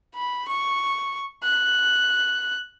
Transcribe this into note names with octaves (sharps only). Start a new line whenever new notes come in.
B5
C#6
F#6